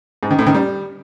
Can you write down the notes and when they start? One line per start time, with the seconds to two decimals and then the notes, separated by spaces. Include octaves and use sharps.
0.23 G#2
0.31 D#3
0.39 A2
0.47 D#3
0.55 G3